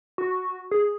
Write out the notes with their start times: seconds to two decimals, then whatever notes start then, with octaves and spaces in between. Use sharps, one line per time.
0.18 F#4
0.71 G#4